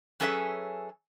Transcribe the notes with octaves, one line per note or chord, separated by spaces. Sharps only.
F#3 C#4 G#4 A4 B4 E5